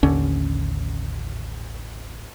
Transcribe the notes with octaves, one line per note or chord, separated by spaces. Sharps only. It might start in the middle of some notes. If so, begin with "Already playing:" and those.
A1 D#2 D3 C#4